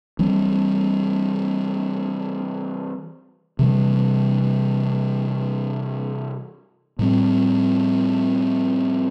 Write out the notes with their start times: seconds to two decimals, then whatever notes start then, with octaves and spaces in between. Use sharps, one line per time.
0.19 E3 G3 C4
3.59 C3 E3 G3
6.99 A2 G3 C4